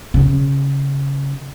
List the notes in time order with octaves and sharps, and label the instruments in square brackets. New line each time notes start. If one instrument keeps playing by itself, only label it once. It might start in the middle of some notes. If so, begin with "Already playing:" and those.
[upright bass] C#3